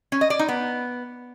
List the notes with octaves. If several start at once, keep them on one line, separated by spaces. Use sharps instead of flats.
C#4
D#5
D5
D#4
B3